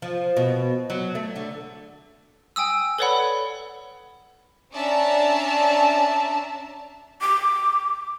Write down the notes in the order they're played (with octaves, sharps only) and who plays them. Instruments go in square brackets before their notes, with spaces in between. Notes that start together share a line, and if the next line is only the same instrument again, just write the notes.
[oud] F3
B2
F#3
A3
D3
[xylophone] G5 G#5 D#6 E6
A4 B4 C#5 D5 F#5 B5
[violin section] C#4 D4 D5 E5 A5 A#5
[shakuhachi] D6